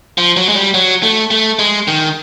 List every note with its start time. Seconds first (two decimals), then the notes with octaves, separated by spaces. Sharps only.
0.18 F3
0.37 F#3
0.49 G#3
0.56 G3
0.74 F#3
1.03 A3
1.31 A3
1.59 G#3
1.88 D#3